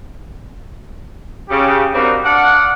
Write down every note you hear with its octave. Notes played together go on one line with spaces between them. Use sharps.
C#3 G4
G3 A#3 C4 D4 D#4 F#4
D4 D5 F5 F#5